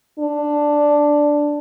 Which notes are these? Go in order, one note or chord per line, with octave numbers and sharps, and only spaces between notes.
D4